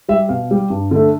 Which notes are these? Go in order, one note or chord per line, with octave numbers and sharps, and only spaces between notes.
G3 E5
B2 F5
G3
G2
D3 A3